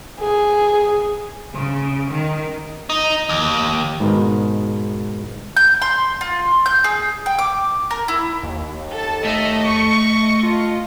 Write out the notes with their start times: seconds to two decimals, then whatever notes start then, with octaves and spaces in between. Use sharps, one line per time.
0.20 G#4
1.53 C#3
2.09 D#3
2.90 D#4
3.29 D#2
4.00 G#2 B2 D#3 A#5
5.57 G6
5.82 C6
6.21 F4
6.66 G6
6.84 G#4
7.26 G5
7.39 D6
7.91 A#4
8.08 E4
8.43 D#2
8.92 A4 A5
9.25 A3 D#5 E5
9.64 C#6
10.09 D#5
10.43 F4